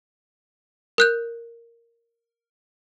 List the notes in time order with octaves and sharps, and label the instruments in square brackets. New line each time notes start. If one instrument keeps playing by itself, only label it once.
[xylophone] A#4 F#6 G6